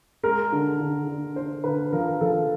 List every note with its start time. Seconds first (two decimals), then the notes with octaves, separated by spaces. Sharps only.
0.23 G#3 A#4
0.52 D3
0.80 D3
1.08 D3
1.36 D3 C5
1.64 D3 B4
1.93 F3 A#4
2.21 F3 A4